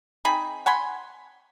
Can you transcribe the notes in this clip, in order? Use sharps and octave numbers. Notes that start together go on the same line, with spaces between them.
C4 D#4 G#4 B5
F#5 G#5 B5 C6